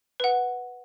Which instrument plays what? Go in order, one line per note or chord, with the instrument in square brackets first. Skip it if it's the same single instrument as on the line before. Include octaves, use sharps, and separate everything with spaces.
[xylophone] B4 F#5